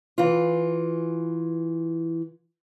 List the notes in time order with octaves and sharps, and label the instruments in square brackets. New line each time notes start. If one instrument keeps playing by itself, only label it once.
[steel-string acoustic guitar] E3 F4